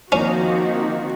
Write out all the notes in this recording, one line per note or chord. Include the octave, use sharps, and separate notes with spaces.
D#3 F3 A#3 C4 C#4 D#4 F#4